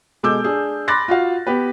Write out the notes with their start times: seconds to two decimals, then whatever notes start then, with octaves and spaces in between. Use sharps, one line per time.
0.23 B2 G#3 A4 D6 E6 G6
0.44 D4 G#4
0.88 B5 C6 D6 F#6 A6 A#6
1.08 F4 F#4 F5
1.47 B3 G4 B4